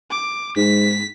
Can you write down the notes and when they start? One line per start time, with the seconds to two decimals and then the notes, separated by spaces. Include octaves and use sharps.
0.10 D6
0.56 G#2 B6